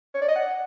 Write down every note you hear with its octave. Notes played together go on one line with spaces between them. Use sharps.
C#5
D5
D#5
F#5